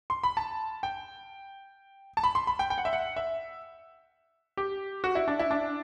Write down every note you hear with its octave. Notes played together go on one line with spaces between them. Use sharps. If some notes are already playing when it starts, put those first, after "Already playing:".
C6
B5
A5
G5
A5
B5
C6
B5
G5
G5
F#5
E5
F#5
E5
G4
F#4
E4
D4
E4
D4